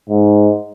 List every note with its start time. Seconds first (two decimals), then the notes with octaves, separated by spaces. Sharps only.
0.10 G#2